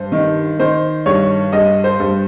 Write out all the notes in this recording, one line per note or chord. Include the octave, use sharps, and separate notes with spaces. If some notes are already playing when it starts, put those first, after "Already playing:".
Already playing: G2 C5
D#3
D#3 C5
G2 C#5
G2 D#5
C5
G2